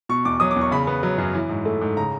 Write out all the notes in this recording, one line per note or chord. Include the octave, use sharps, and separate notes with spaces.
B2 C#6
E2 D6
F#3 D#6
D6
E2
C#6
C#3 B5
B3
F#3
F#2
E3
G#2
A3
G#2
C#3 A#5